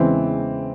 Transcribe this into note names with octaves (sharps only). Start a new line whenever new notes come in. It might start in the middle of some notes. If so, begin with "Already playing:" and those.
Already playing: E2 C#3 E3 G#3 C4